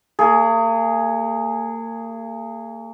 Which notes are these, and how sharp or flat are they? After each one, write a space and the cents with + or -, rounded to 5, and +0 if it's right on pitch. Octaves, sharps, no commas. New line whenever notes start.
A#3 -40 G#4 +0